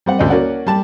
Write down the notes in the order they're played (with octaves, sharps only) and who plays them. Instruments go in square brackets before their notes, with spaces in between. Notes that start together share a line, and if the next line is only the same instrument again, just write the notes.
[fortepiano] G3 C4 F#5
D2 C#3 G3 D5 D#5
A#3 C#4 F#4 D5 F#5
G3 A5